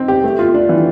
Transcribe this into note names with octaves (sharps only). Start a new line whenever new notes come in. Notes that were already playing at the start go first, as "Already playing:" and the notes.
Already playing: C4 D#4
G4
A3
F4
D4
E3